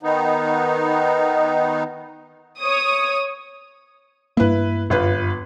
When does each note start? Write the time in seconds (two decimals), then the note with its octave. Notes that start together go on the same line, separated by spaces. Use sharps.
0.03 D#3 B3 D#4
2.60 C#5 D#6
4.37 G2 A#3 E4 B4
4.90 G1 F#2 F4 B4